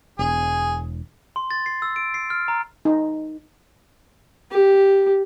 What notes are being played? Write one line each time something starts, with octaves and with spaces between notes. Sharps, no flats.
E1 G#4
C6
A6
C7
E6
D7
C7
F6
A#5
D#4
G4